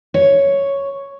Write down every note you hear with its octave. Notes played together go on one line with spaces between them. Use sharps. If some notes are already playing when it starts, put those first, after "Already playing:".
C#5